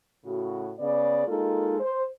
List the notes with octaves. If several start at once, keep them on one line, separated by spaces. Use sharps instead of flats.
A2 C#3 F#4
C#3 B3 G#4 D5
G#3 A#3 D#4 F4 A4
C5